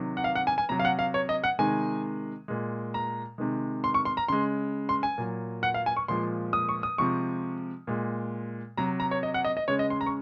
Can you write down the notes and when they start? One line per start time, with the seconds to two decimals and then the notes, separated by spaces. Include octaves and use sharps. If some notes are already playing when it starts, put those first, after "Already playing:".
Already playing: C3 D#3 F#3
0.17 F#5
0.24 F5
0.35 F#5
0.47 G#5
0.58 G#5
0.69 C3 F#3 A#5
0.79 F5
0.85 F#5
0.99 F5
1.14 C#5
1.29 D#5
1.44 F#5
1.59 C3 D#3 G#3 G#5
2.48 A#2 G#3
2.94 A#5
3.38 C3 D#3 G#3
3.84 C6
3.94 C#6
4.05 C6
4.17 A#5
4.28 C#3 G#3 C6
4.89 C6
5.03 G#5
5.18 A#2 F#3
5.63 F#5
5.74 F5
5.86 G#5
5.97 C#6
6.08 A#2 F3 G#3 C6
6.53 D#6
6.69 C#6
6.83 D#6
6.98 C3 F3 G#3 C#6
7.87 A#2 G#3
8.77 C3 F#3 A#5
9.00 A#5
9.11 C#5
9.23 D#5
9.34 F#5
9.44 D#5
9.57 D#5
9.68 C#3 G#3 C#5
9.79 D#5
9.90 C6
10.01 A#5
10.06 C#6